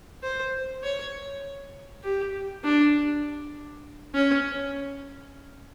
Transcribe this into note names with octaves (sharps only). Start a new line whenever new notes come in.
C5
C#5
G4
D4
C#4